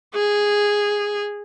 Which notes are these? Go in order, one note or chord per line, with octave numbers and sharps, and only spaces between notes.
G#4